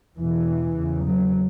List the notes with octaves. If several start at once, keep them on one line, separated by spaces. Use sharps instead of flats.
E2 B2 E3
E2 C#3
F#3